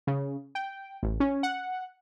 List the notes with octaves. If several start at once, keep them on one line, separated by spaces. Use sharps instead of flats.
C#3
G5
A1
C#4
F#5